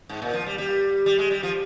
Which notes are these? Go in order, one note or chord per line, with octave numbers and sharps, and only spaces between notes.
G#2
A#2
F3
G3
G3
G3
G#3
G3
F3